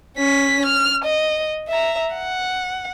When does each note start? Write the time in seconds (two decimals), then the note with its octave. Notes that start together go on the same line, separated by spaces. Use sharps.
0.17 C#4 B6
0.66 F6
1.05 D#5
1.68 E5 A#5
2.15 F#5